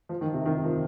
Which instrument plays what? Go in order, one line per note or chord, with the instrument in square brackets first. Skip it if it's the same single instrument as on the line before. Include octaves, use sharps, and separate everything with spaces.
[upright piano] F3
D#3
C3
D#3
F3